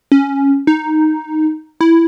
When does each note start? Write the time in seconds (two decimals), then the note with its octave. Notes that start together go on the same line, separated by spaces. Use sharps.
0.12 C#4
0.67 D#4
1.81 E4